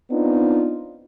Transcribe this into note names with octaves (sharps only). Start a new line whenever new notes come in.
B3 C4 D4 D#4 F4